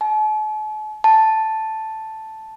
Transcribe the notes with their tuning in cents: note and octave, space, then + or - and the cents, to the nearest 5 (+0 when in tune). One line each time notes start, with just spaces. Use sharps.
A5 -45
A5 +0